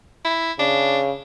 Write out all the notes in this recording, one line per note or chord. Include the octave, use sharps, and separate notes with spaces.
E4
C#3 D4